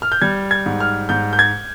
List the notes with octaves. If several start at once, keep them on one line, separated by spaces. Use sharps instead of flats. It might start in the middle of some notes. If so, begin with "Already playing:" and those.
F6
G6
G3 G#6
G#6
G#2
F6
G#2 G6
G6
G#6